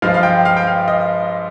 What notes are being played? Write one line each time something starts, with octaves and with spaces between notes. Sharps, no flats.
G2 F3 G#3 F5
F5
G5
F5
G5
F5
D#5